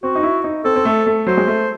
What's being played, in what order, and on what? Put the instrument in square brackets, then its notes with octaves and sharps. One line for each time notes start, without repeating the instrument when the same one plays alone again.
[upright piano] C4 [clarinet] F#4
[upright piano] D#4
E4
D#4
[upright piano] C4 [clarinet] A4
[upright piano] C4
A3
A3
[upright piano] F#3 [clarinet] C5
[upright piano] G#3
A3